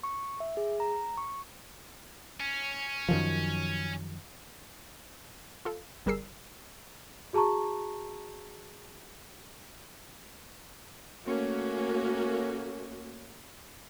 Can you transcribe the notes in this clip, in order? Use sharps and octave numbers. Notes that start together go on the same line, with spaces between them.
C#6
E5
G#4
A#5
C#6
C#4
F#2 D#3 F3
F4 A4 F5
G1 G3 G#4 A#4 E6 C7
F#4 G#4 A5 A#5 C#6
A3 A#3 C#4 F#4